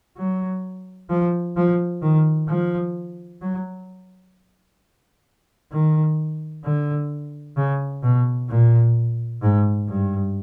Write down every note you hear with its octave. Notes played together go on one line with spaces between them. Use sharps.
F#3
F3
F3
D#3
F3
F#3
D#3
D3
C#3
B2
A#2
G#2
G2